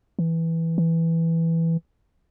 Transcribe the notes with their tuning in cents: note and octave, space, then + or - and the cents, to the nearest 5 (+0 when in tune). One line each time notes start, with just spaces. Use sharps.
E3 -5
E3 +0